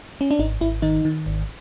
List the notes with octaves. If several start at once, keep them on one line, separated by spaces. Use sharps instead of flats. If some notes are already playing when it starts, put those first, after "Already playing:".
C#4
D4
G#1 D#4
G#1 E4
D#3 D#4
D#3
G#1